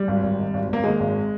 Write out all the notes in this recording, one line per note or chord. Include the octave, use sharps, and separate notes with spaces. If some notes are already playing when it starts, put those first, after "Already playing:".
Already playing: G3
G#1
G#1
D#3
G#1
G#1 A#3
D#3 G#3
G#1